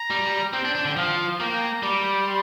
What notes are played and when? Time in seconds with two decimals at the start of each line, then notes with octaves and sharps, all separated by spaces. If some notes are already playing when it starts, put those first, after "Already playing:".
Already playing: A#5
0.10 G3
0.53 C4 G5
0.65 D4
0.75 D4
0.85 D3
0.96 F3 F5
1.40 A#3 G5
1.50 G5
1.61 A#5
1.83 G3 D6
2.26 C6